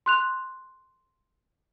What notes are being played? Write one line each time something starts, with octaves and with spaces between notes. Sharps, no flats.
C6 F#6 F7